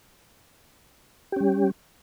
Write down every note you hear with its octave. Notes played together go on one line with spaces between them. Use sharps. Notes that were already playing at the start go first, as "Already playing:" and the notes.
G3 C#4 G4